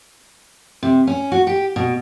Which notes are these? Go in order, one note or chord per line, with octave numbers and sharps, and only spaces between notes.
C3
C#4
F#4
G4
B2